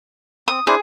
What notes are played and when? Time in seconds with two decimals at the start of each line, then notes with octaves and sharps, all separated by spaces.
0.48 C4 D#6
0.67 D4 E4 G#4 C5